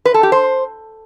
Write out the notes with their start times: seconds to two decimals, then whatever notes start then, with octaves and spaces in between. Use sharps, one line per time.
0.05 B4
0.14 A4
0.23 G4
0.32 C5